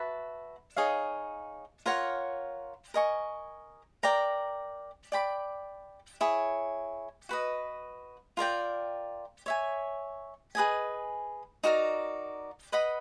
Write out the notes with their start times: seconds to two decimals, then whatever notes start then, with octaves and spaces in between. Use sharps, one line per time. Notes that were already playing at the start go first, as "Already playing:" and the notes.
Already playing: F#4 B4 E5 A5
0.76 D#4 G#4 C#5 F5
1.86 F4 A#4 C#5 F#5
2.94 A#4 D#5 G#5 C#6
4.03 A#4 D5 G5 A#5
5.12 D5 G5 B5 D6
6.21 E4 G#4 C#5
7.29 F#4 B4 D#5
8.37 F4 A#4 D5 G5
9.46 C#5 E5 G#5
10.55 G#4 B4 D#5 G#5
11.64 D#4 F#4 A#4 D5
12.72 B4 D#5 F#5 B5